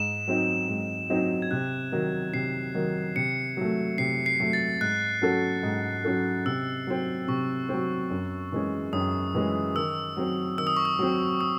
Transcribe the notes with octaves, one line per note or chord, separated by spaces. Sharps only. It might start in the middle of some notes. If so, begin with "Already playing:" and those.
Already playing: G#2 E7
F#3 C4 D#4
G#2
F#3 C4 D#4
G#6
C3 F#6
D#3 F#3
C3 C7
D#3 F#3
C3 C#7
F#3 A3
C3 C7
C7
F#3 A3
A6
G#2 F#6
F#3 C#4 F#4 A4
G#2
F#3 C#4 F#4 A4
C3 E6
F#3 C4
C3 C#6
F#3 C4
F#2
E3 G#3 C#4
F#2 D#6
E3 G#3 C#4
D#3 E6
F#3 C4
D#3 E6
D#6
C#6
D#6
F#3 C4
D#6